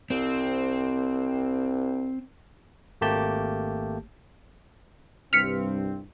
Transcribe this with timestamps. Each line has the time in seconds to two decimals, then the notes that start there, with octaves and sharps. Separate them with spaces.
0.10 C2 C4
3.01 G#1 A3 A#3 G4 A5 G6
5.33 C2 G2 C4 F6 B6 C#7